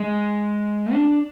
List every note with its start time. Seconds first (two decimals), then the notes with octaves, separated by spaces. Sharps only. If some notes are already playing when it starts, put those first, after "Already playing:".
Already playing: G#3
0.93 D4